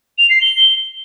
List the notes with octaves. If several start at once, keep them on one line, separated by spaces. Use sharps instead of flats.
F7
C7
G7